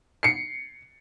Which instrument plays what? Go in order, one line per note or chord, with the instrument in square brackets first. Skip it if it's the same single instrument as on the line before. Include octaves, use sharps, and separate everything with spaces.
[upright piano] C7 C#7